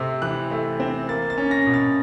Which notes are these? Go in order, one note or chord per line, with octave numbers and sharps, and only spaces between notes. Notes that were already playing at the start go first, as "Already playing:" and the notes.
Already playing: C3 A3 C4
E3 F#6
A3
C4
A#3 A6
A6
C#4
A#6
B2
A6